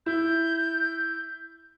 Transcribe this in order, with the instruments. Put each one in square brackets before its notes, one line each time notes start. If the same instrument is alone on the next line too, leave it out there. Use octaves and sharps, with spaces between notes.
[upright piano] E4 [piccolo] G6